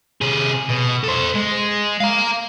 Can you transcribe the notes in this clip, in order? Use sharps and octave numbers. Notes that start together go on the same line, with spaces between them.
C3 G#4
B2
A4 C5
G#3
F5 A#5